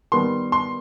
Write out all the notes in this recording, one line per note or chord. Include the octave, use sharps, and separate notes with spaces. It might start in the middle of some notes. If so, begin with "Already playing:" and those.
D#3 G3 B3 C6
C6